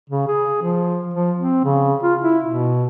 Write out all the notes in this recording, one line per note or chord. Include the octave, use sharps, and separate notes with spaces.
C#3
G#4
F3
F3
C4
C#3
F4
E4
B2